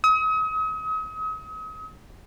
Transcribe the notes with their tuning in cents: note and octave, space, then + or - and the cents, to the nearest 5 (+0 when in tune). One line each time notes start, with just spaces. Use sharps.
D#6 +40